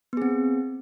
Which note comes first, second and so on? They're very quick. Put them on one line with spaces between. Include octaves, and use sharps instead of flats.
B3 G#4 C4